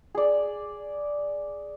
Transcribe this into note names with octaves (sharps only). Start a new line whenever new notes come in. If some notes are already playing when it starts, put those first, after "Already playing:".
G#4 D5